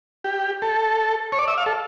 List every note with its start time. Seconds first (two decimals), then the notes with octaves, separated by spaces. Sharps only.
0.24 G4
0.62 A4
1.32 C#5
1.39 D5
1.48 E5
1.58 F5
1.66 A4